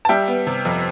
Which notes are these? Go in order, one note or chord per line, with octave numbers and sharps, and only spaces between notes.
A5
G3 E5 G5
B3
C3
F2